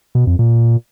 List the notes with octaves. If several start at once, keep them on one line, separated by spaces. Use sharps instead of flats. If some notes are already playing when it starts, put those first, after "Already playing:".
B2
F2
A#2